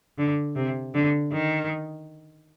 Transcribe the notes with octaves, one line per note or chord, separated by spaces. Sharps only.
D3
C3
D3
D#3